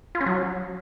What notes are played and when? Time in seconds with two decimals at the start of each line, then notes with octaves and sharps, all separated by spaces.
0.15 F4
0.21 C#4
0.26 F#3